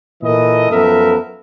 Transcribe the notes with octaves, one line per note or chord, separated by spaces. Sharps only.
A#2 E3 A4 A#4 D#5
F#2 F3 B3 A4 A#4 E5